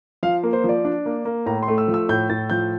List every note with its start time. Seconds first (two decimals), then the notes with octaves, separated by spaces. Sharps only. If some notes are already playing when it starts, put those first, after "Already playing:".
0.23 F3 F5
0.43 A#3
0.53 C5
0.64 F3 D5
0.85 D4
1.06 A#3
1.25 A#3
1.46 A2 A#5
1.63 C6
1.68 A3
1.78 E6
1.88 F3
1.94 E6
2.09 A2 G6
2.30 A2 A6
2.50 F3 G6